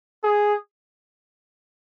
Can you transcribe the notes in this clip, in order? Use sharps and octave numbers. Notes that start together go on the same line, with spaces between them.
G#4